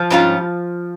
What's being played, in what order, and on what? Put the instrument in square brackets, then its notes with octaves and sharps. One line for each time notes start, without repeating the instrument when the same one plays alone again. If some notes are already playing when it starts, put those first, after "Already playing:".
Already playing: [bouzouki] F3
[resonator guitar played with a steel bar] G#2 G3 C#4 F4